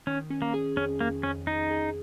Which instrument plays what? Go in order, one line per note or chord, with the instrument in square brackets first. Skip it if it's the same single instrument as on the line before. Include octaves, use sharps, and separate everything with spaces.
[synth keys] D#3 [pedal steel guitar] C#4
[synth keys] C#4
[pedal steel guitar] A#3
[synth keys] G#4
[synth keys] F2 [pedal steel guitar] C#4
[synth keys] F2 [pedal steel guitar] A#3
[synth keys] F2 [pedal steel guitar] C#4
[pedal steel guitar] D#4 [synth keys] G#4
[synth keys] G#4